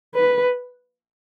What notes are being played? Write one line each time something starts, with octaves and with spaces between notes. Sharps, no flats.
B4